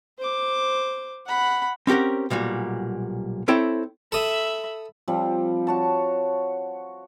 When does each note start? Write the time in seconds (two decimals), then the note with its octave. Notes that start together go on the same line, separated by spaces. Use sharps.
0.19 C5 D6
1.27 F#5 B5
1.87 C4 C#4 G4 A#4 F#5
2.30 B1 A#2 G3 F#4
3.48 C4 E4 A4 C#5 G5
4.12 A4 E5 B5 D#6
5.08 F3 G3 C4
5.67 F#4 C#5 A5